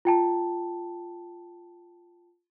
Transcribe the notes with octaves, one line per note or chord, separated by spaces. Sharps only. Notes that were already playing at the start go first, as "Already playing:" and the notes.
F4 G5 A5